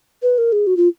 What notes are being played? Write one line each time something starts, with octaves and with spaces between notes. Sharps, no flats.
B4
A#4
G#4
F#4
F4